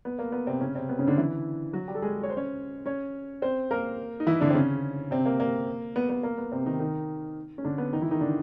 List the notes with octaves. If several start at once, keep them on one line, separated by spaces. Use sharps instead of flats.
B3
A#3
B3
C3 C4
C#3 C#4
C3 C4
B3
C#3 C#4
D3 D4
E3 E4
F#3 F#4
G3 G4
A4
G#3 G#4
C#5
C5
C#4 C#5
C#4 C#5
C4 C5
A#3 A#4
D#4
E3 E4
D3 D4
C4
C#3 C#4
C3 C4
A#3
A#3
B3
B3
A#3
B3
C3 C4
D#3 D#4
D#3 D#4
C#4
D3 D4
B3
D#3 D#4
E3 E4
D#3 D#4
D3 D4